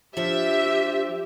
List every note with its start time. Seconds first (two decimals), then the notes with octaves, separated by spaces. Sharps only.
0.17 F3 D4 G4 E5